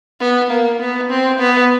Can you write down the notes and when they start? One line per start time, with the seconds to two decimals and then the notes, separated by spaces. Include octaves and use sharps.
0.20 B3
0.50 A#3
0.80 B3
1.10 C4
1.39 B3